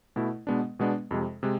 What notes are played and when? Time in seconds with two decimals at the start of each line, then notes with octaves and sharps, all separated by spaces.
0.16 B2 A3 E4
0.47 B2 G#3 B3 D4
0.79 B2 G#3 B3 D4
1.11 F2 C3 G#3
1.43 C3 G#3